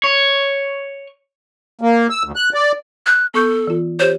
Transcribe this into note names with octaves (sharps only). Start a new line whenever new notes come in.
C#5
A#3
E6
D2
F#6
D5
F#6
B3 A4 C#6 G6
E3 F4
G4 C5 C#5